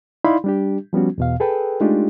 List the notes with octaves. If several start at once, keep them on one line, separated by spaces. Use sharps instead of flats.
D#4 E4 D5 F5 B5 C6
G3 D4 G4
F3 G3 B3 C#4 F#4
E2 B2 F5
G#4 A4 B4 G5
G#3 A3 D4 D#4 F4 G4